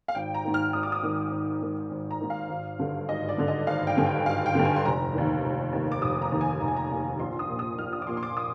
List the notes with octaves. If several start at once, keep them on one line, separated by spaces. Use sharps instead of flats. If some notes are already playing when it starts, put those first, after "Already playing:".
F5
G#1 G5
A#5
G#2 D#3
F6
G#1 D#6
D6
D#6
G#2 D#3
G#1
G#2 D#3
G#1
A#5
G#2 D#3
F5
G#1
G2 D3
G#1 D#5
D5
G2 D3
D#5
G#1 F5
G5
G2 D3 G#5
G5
G#1 F5
G5
G2 D3
G#5
C6
F1 A#5
D#2 D#3
F1
D#2 D#3
D6
F1 D#6
A#5
D#2 D#3
G#5
F1 A#5
G#5
A#5
D#2 D#3
A#1 C6
D#6
A#2
D#6
A#1 F6
D#6
D6
A#2 C6
C6
D6
D#6